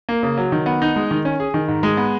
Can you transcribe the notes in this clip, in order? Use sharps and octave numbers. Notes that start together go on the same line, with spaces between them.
A#3
C#3
F#3
D#3
B3
D#4
G#3
D#3
C#4
G#4
D#3
G#2
G#3
B3